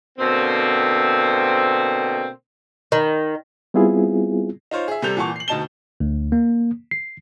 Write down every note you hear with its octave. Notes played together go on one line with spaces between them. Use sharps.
B2 D3 A#3 C4
D#3
G3 B3 C4 E4 F4 G#4
D#4 F4 C5 C#5
G#4 E5
C3 G3 C4 A4 G6 F7
A#2 E3 F#5 A5 C#6
C7 F#7
D2 B2 D#4 A5 E7 G7
D2
A#3
C7